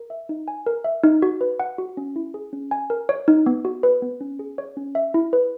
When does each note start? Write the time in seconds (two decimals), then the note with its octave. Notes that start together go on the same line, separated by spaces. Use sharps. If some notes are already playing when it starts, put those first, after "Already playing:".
Already playing: A#4
0.10 E5
0.29 D#4
0.48 G#5
0.66 A#4
0.84 E5
1.03 D#4
1.22 F#4
1.41 B4
1.60 F#5
1.78 F#4
1.97 C#4
2.16 E4
2.34 G#4
2.53 C#4
2.71 G#5
2.90 A#4
3.09 C#5
3.28 D#4
3.46 B3
3.65 F#4
3.83 B4
4.02 B3
4.21 C#4
4.39 G#4
4.58 C#5
4.77 C#4
4.95 E5
5.14 E4
5.33 B4